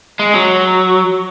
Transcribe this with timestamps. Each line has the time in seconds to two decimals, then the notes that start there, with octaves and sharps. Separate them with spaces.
0.19 G#3
0.34 F#3